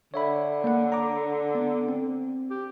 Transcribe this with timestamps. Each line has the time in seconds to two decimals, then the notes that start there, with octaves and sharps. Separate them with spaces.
0.14 D3 C#5 E5 B5
0.64 A#3 F#5
0.92 A#5 D6
1.55 B3
1.89 C4
2.51 G4